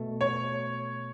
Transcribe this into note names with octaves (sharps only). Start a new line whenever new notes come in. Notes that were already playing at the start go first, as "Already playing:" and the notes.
Already playing: B2 A3
C#5